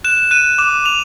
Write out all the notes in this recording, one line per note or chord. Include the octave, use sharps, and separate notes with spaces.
F#6 E7
F#6 D#7
D6 E7
D6 F7